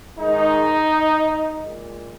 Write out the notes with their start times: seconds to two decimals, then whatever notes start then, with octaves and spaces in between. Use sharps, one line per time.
0.19 G#2 D#3 G#3 D#4
1.60 A#2 G#3